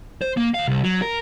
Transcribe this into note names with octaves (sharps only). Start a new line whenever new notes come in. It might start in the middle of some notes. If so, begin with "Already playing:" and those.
C5
A#3
D#2 F5
C2
F#3
A#4